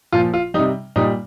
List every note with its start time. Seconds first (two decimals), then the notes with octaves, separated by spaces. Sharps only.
0.12 A#2 F3 F4
0.34 F4
0.54 G3 D#4
0.59 C3
0.96 A#2 G3 D#4